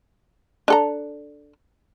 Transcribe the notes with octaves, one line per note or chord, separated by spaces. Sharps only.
D4 A4 A#5